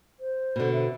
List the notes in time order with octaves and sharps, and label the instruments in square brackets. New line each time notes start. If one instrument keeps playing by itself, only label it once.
[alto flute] C5
[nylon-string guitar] B2 D3
[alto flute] E5